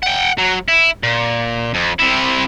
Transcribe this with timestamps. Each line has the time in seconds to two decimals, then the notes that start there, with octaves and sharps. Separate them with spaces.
0.03 F#5 G5
0.38 F#3
0.68 E4
1.03 A#2
1.74 F2
1.99 C3 E4